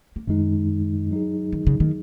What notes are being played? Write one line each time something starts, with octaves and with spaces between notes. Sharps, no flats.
A#3
F#2 D#3 G#3 C#4 D#4
F#3 D#4 G#4
D#3
C#3
D#3